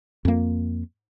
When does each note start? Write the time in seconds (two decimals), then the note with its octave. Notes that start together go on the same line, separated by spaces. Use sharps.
0.25 F2 A#3